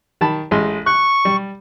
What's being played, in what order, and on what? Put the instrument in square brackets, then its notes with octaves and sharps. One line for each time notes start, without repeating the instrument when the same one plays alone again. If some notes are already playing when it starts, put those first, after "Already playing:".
[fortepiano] D#3 A5 B5
A1 G#3 C6
[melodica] C#6 [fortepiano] F#6
[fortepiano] G3